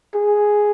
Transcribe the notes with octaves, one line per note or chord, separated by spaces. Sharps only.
G#4